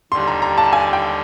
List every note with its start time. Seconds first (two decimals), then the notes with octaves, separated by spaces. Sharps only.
0.12 D#2 D3 G3 C6
0.27 A#5
0.42 A#5
0.58 A5
0.73 G#5
0.93 G5